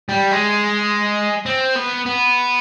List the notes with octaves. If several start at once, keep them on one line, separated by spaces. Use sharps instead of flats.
G3
G#3
C4
B3
B3